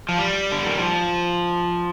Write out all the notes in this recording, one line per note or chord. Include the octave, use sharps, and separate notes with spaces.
F3
G3
D3
D#3
F3